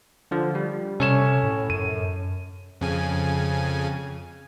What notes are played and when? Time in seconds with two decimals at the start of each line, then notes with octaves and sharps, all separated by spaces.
0.31 D3 F3
0.55 G3
1.00 C3 C#4 A4 C#5 E7
1.44 A2
1.70 F#2 D#7
2.81 F2 C#3 G#5